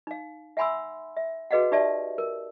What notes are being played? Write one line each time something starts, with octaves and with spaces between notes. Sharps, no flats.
D#4 F5
E5 F#5 G#5 B5 C6 E6
E5
F#4 G#4 B4 D#5 F5 F#5
D#4 G4 D5 E5 A5
A#4